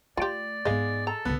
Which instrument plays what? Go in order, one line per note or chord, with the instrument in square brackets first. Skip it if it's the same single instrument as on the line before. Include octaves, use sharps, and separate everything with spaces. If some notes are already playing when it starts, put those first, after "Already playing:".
[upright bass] A3 [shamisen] F4 G4 [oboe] D5
[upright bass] G#2 B3 [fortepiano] G#3 [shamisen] D#5 F5
[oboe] A4 [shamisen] A#5
[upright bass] C2 D3 [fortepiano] B3